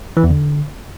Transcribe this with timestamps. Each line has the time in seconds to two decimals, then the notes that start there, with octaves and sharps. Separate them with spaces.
0.17 E3
0.24 E2
0.30 D3